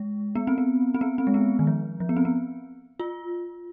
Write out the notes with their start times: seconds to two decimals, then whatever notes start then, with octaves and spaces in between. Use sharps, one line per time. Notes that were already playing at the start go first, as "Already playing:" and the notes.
Already playing: G#3
0.35 B3
0.47 C4
0.58 B3
0.94 C4
1.01 B3
1.18 C4
1.27 G#3
1.34 B3
1.59 D#3
1.67 F3
2.00 F3
2.09 B3
2.17 C4
2.25 B3
3.00 F4